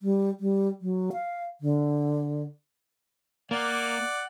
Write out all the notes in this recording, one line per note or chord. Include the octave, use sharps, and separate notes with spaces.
G3
G3
F#3
F5
D3
A#3 D5 F#5